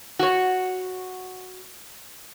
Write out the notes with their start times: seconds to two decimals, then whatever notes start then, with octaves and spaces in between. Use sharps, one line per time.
0.19 F#4 C#5